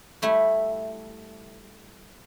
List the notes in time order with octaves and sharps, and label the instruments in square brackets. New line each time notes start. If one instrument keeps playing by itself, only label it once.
[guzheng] G3 A3 E4